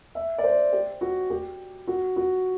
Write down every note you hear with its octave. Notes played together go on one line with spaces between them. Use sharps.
E5
D5
C5
G4
F#4
G4
F#4
F#4